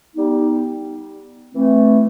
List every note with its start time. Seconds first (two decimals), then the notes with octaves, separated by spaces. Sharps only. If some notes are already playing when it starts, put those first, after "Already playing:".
0.15 G3 B3 D#4
1.52 E3 A3 C4